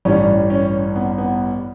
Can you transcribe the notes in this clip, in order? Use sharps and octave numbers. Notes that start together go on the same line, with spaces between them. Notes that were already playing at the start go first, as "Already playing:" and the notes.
A1 G2 E3 G3 C#4
C#4
B3
B3